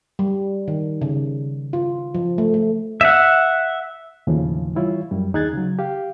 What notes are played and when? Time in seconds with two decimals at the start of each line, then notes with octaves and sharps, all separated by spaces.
0.19 G3
0.68 D#3
1.01 C#3
1.73 F4
2.15 F3
2.38 A3
2.54 A3
3.01 E5 F#5
4.27 D#2 A2 C#3 E3 F3
4.76 E3 G3 E4 F4 C#5
5.11 F#2 G3
5.34 D#2 D#4 G#4 F#6 G#6 A6
5.53 C#3 F#3
5.79 G4 F5